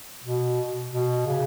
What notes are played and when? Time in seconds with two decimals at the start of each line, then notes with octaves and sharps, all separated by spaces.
0.24 B2
0.92 B2
1.27 C#3